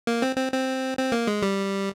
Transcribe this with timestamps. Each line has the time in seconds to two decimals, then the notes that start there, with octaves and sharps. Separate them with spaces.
0.07 A#3
0.22 C4
0.37 C4
0.52 C4
0.97 C4
1.12 A#3
1.27 G#3
1.42 G3